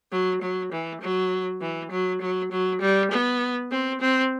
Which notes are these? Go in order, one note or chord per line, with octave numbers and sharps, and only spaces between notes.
F#3
F#3
E3
F#3
E3
F#3
F#3
F#3
G3
B3
C4
C4